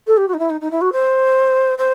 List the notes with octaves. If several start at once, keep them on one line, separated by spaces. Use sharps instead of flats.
A4
G4
F#4
D#4
E4
D#4
D#4
E4
F#4
C5
C5